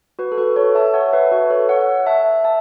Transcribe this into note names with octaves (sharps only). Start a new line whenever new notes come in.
F#4 B4
A4
F#4 B4
A4 C#5
E5 A5
C#5 F#5
B4 E5
F#4 B4
A4 C#5
C#5 F#5
E5 A5
E5 A5